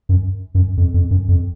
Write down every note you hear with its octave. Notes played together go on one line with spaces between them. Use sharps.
F#2
F#2
F2
F2
F#2
F2